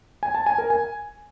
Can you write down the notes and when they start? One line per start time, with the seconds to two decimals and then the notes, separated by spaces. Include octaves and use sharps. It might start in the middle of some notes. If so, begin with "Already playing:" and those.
0.23 G#5
0.35 A5
0.46 G#5
0.58 A#4
0.70 G#5